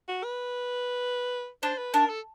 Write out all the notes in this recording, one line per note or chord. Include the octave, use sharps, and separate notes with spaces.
F#4
B4
D4 C5
B4
D4 A#4
A4